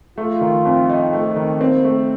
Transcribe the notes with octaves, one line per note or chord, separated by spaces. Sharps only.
A3 F4
D#3
F2
D#4
A3
D#3
A#3 C4
A3